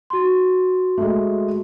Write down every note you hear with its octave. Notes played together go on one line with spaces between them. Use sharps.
F#4 C6
G#3 A3